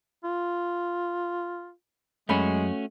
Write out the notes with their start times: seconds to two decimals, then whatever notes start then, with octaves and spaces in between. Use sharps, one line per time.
0.24 F4
2.29 F#2 G#3 A3 C#4 F#4 B5